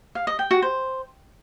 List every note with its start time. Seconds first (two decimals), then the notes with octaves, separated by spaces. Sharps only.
0.15 F5
0.27 D#5
0.39 G5
0.51 F#4
0.62 C5